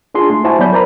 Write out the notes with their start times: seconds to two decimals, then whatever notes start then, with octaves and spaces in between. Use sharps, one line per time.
0.14 D4 F4 G#4 A5 C6
0.30 A3
0.44 E4 F#4 C5 G#5 A5
0.59 F#3 B3 D5 B5 G6
0.72 A#4 C5 D5 A#5 B5